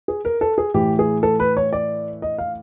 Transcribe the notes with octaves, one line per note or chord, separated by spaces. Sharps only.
G#4
A#4
A4
G#4
A2 E3 G4
G#4
A4
B4
C#5
D5
D#5
F5